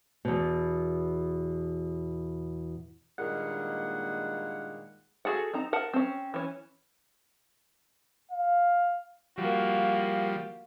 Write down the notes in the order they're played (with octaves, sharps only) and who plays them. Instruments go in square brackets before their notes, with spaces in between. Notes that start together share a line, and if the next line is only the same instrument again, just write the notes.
[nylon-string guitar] E2 B2
[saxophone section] G2 A#2 D#3 G#3 A#3 F#5
[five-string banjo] F#4 G#4 A4 F#5
C4 D#4 A#5
A#4 F#5 A5
C4 C#4
E3 C#4
[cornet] F5
[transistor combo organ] F3 G3 [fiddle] A#3 F#4